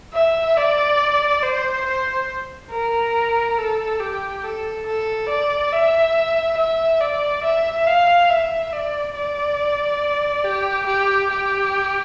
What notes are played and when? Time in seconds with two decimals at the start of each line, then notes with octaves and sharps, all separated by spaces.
0.13 E5
0.57 D5
1.42 C5
1.86 C5
2.71 A#4
3.58 A4
4.00 G4
4.44 A4
4.86 A4
5.29 D5
5.72 E5
6.57 E5
7.01 D5
7.43 E5
7.87 F5
8.29 E5
8.72 D5
9.15 D5
10.44 G4
10.86 G4
11.30 G4